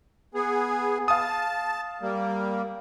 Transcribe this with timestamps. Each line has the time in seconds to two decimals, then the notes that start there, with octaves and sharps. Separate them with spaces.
0.34 B3 G#4
1.08 F5 A5 D#6
2.02 G3 A#3